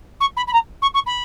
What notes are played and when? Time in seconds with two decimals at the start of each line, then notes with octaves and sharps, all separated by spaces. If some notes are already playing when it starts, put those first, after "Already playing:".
0.20 C#6
0.37 B5
0.47 B5
0.53 A#5
0.82 C#6
0.94 C#6
1.06 B5